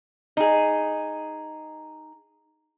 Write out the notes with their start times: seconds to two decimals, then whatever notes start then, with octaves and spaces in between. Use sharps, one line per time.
0.37 D#4 G#4